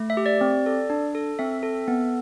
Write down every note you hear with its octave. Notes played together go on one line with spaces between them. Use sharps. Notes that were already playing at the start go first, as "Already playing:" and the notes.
Already playing: A3
E5
G4
D5
C4
A4
D4
A4
C4 E5
A4
B3